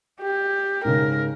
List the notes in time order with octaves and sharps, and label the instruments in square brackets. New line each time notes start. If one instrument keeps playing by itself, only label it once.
[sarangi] G4
[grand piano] G#2 C#3 [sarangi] A#4